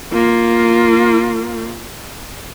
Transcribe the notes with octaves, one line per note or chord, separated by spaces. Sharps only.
A#3 F4